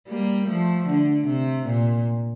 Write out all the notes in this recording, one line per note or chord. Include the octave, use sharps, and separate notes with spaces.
G3 A#3
F3 A3
D3
C3
A#2